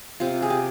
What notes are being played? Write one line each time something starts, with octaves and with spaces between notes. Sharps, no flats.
C3 F4
G#4
G4